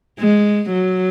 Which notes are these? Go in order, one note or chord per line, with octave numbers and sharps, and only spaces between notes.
G#3
F#3